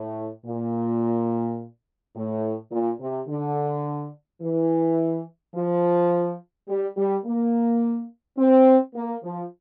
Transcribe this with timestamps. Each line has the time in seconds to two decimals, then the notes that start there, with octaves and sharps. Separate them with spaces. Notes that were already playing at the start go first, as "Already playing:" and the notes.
Already playing: A2
0.46 A#2
2.16 A2
2.72 A#2
3.01 C3
3.29 D3
4.42 E3
5.55 F3
6.69 G3
6.97 G3
7.25 A#3
8.38 C4
8.95 A#3
9.24 F3